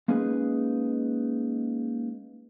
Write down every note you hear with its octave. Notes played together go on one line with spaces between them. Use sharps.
G#3 A#3 C#4 D#4 G#4 B4